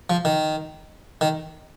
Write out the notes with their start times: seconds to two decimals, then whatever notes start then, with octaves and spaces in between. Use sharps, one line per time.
0.10 F3
0.25 D#3
1.21 D#3